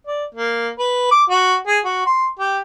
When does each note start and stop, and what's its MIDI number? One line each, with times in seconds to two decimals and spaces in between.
0.07 0.24 74
0.35 0.69 58
0.79 1.09 71
1.11 1.23 86
1.30 1.56 66
1.67 1.79 68
1.84 2.05 66
2.06 2.26 84
2.39 2.59 67